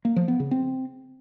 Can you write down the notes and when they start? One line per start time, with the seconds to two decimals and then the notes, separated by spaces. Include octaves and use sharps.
0.05 A#3
0.16 F3
0.28 B3
0.40 C#3
0.51 C4